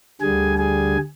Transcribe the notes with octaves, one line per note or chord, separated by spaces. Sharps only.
D2 D3 G3 G#4 G#5
G#4 G#5